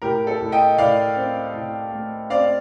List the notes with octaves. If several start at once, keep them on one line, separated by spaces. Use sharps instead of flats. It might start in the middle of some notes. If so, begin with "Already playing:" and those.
A2 G4 A#4
A4
A2
D#5 G5
A2 D5 F5
C4
A2
A3
C4 D5 F5